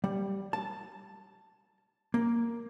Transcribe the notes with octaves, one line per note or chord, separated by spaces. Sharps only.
G3
A5
A#3